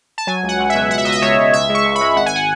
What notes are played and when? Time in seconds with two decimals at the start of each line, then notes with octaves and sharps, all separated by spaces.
0.18 A5
0.27 F#3 G#5
0.43 C#2
0.49 F#5
0.59 C#2
0.70 E5
0.75 B2
0.91 C#2 F#5
0.98 E5
1.05 C#2 D#5
1.12 E5
1.22 C#2 C#5
1.37 C#2
1.53 C#2 E5
1.69 G#3
1.75 C#6
1.85 C#2
1.96 B5
2.01 G#3
2.16 G#1 F#5
2.26 G#5
2.36 F#5